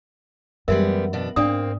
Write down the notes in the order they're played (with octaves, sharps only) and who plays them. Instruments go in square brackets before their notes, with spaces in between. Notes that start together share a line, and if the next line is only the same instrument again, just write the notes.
[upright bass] F#2 E3 [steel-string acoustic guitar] G3 G#3 B3 [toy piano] A#4 E5
[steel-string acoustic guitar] B2 D4
[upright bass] G#2 [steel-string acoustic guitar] A#3 C4 [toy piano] D4 D5 D#6